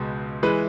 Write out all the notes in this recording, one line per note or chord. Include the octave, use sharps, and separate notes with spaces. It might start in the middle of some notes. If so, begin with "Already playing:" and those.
Already playing: C#2 B2 G#3
E3 G#3 B4